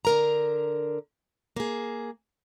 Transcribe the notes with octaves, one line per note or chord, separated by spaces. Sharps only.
D3 A#4 A#5
A#3 G#4